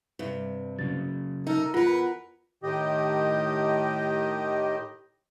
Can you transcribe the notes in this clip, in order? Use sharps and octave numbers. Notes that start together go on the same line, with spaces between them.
G2 C3
C#3 F#3 A6
D#4 A4 A#4
E2 F4 A#4 B4 F#5
A2 D#3 G4 D#5